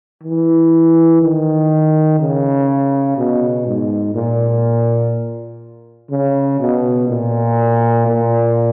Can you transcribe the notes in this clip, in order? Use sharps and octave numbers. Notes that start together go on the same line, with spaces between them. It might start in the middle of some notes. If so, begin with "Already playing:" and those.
E3
D#3
C#3
B2
G#2
A#2
C#3
B2
A#2
A#2